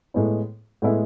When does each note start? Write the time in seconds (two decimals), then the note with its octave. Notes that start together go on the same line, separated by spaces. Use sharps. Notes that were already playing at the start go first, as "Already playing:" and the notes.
0.14 A2 G#3 B3 E4
0.82 A2 G#3 B3 E4